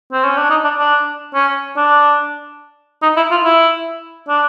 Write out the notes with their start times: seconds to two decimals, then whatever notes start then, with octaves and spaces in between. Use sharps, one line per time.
0.12 C4
0.25 C#4
0.37 D4
0.50 D#4
0.64 D4
0.78 D4
1.34 C#4
1.77 D4
3.02 D#4
3.17 E4
3.31 F4
3.44 E4
4.28 D4